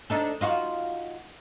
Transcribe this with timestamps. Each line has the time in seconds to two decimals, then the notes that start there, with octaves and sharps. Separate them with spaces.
0.10 D4 D#4 A4
0.41 D#4 F4 F#4